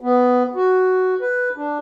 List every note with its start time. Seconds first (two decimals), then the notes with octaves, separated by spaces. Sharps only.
0.01 B3
0.55 F#4
1.21 B4
1.56 D4